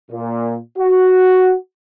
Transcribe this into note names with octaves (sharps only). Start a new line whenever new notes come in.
A#2
F#4